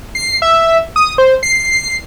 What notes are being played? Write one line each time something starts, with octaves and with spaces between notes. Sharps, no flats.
C7
E5
D#6
C5
C7